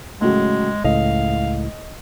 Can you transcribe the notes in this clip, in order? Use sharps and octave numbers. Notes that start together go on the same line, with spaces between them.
A2 C#3 F#3 G#3
C#2 A2 D#5 F5